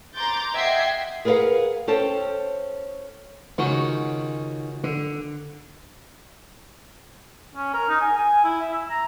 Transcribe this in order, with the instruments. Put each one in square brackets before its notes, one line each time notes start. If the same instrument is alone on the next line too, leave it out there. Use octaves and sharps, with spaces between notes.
[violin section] A#5 C6 D6 G6 A6
D#5 E5 F#5 G5 G#6 C7
[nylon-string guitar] G#4 A#4 B4 C#5 F5 F#5
C#4 A4 C5 G5 A5
[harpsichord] C#2 C#4 F#4 [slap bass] D#3
[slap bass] D3
[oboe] C#4
A#4
D#4
G#5
G#5
E4
E5
E6
A#5